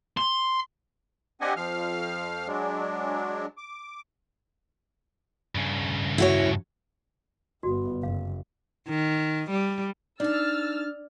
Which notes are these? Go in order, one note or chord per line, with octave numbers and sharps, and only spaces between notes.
C6
C4 D4 G4 D#5 F#5 G#5
F2 F3 F5 F6
F#3 G#3 D4
D6
G2 C#3
E4 F#4 C#5
G1 B3 F#4
F#1 F5
D#3
G3
D4 D#4 D5 A5 E6 F6 A6